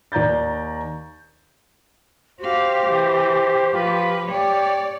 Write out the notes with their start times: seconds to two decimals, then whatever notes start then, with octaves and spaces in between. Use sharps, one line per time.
0.12 D#2 D5 A#5 G6 A6
2.40 F#4 G4 C5 F5
2.87 E3
3.74 F3 F4 B4
4.29 G4 C#5 D5